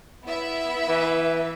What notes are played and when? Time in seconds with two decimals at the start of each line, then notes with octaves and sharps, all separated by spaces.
0.24 B3 E4 E5
0.89 E3